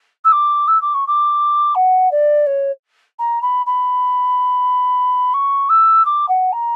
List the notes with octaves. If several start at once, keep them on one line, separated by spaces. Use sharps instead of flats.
E6
D6
E6
D6
C#6
D6
F#5
D5
C#5
A#5
B5
B5
C#6
E6
D6
F#5
A#5